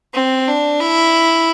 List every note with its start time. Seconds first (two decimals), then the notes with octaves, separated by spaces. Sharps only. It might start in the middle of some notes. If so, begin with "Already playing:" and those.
0.14 C4
0.48 D4
0.80 E4